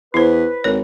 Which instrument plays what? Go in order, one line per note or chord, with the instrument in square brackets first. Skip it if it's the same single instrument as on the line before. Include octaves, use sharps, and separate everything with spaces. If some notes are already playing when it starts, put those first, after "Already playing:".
[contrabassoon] E2 [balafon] E4 C5 [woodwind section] B4
[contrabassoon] G#1 [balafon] A#4 C#5